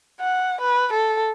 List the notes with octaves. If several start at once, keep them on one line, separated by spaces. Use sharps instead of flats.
F#5
B4
A4